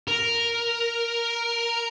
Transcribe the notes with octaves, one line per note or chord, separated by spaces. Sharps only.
A#4